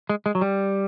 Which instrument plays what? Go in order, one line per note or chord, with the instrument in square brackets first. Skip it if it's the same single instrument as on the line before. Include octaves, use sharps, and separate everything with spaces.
[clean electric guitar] G#3
G#3
F#3
G3